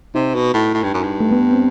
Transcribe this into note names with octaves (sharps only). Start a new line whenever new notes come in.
C3 D#4
B2
A2
A2
G2
F#2
G2
A3
B3
C4